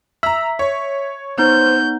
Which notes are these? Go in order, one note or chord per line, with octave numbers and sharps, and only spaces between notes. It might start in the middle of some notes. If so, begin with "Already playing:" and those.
E5 A#5 E6
C#5
B3 D#4 C5 G6